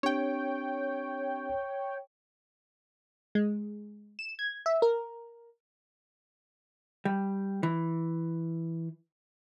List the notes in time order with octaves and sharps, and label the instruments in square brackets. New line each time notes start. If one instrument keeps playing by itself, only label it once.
[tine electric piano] C4 D4 G4 [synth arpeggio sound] C#5 G5
[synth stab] G#3
E7
G#6
E5
A#4
[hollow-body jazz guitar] G3
E3